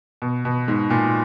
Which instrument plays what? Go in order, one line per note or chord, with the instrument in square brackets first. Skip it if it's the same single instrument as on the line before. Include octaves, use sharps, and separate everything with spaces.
[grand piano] B2
B2
G#2
A#2